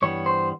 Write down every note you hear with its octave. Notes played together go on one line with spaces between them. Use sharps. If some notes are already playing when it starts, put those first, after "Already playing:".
G2 E3 G3 B3 C#5
C5